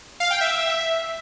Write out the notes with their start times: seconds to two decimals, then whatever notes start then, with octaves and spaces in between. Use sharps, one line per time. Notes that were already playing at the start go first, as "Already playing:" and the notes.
0.20 F5
0.30 G5
0.41 E5